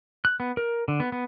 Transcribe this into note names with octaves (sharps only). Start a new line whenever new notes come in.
F#6
B3
A#4
D3
B3
B3